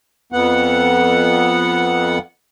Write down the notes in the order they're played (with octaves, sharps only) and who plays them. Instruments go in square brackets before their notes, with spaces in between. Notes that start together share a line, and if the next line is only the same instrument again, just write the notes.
[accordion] F2 B3 F#5